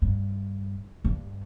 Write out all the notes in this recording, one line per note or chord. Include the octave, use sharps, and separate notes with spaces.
G2
G2